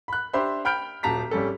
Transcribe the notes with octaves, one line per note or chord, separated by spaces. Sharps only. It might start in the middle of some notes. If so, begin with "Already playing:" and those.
B5 F#6
D4 G4 C5 E5 B5 C6
G5 B5 F6 G6 D7
D#1 F#3 A5 A#5 B6
G#1 G3 C#4 A4